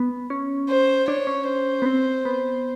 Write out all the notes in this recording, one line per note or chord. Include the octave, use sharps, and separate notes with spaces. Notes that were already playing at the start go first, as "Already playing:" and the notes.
Already playing: B3
C#4
C5
D4 C#5
C#4
C5
B3
C4
B3